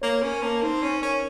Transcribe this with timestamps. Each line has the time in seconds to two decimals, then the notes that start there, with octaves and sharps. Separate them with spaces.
0.02 A#3 C#5
0.22 C#4 A#4
0.42 A#3 A5
0.63 C4 D#4
0.83 C#4 C#5
1.02 C#4 A#4